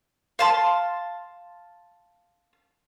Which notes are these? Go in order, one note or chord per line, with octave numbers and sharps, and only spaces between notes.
F5 A5 C6